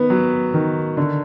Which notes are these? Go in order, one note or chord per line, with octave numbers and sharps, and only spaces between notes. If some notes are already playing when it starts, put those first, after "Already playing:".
Already playing: D#3 B3 B4
F#3
D#3
D3